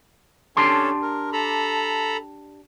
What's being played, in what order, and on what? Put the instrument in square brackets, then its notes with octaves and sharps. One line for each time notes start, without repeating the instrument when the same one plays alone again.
[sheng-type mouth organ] C#4 A4 C#5 [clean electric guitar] D4 G4 C6
[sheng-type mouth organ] A#4
A4 A#5 B5